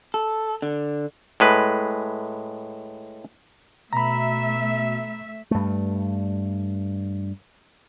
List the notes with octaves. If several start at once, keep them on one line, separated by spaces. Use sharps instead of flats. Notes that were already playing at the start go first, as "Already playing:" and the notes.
A4
D3
A2 G#3 B4
B2 A3 E5 A#5 B5
G2 A3